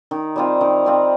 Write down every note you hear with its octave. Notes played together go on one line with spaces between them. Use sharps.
D#3
G3 C4 F4
D#3
G3 C4 F4